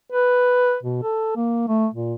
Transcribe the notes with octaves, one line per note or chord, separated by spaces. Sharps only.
B4
B2
A4
A#3
A3
A#2